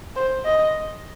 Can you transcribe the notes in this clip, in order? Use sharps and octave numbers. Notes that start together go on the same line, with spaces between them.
C5
D#5